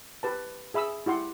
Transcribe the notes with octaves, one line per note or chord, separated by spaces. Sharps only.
G4 B4 A5
G#4 E5 B5 D#6 E6
E4 G4 F#5 C6